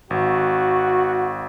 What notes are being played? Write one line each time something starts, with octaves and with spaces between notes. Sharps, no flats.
G#1 F#4